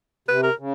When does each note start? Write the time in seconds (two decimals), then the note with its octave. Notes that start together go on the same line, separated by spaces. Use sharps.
0.28 C3 B4
0.43 A#4
0.58 C#3